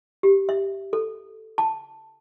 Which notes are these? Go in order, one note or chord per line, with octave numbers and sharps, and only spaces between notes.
G4
E5
A4
A5